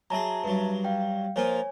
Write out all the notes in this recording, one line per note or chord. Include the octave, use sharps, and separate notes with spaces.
F#3 G#4 E5 A5 A#5
G2 F#3
F5 G5
F3 A#3 F4 C#5 G#5